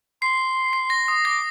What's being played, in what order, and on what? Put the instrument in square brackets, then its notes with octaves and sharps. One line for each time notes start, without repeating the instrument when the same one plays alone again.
[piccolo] C6 [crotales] C7
[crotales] C7
A#6
D#6
[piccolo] D6 [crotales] A#6